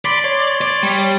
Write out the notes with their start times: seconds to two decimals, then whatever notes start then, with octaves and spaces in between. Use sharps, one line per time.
0.05 D5 B5 C6 D6
0.24 C#5 C6
0.61 D5
0.83 G3